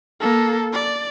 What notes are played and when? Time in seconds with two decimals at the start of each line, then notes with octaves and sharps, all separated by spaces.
0.21 A#3 A4
0.73 D5